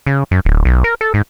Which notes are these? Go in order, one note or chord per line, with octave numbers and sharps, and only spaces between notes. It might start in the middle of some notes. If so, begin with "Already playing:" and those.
C#3
F#2
D1
B1
A#4
A4
G#2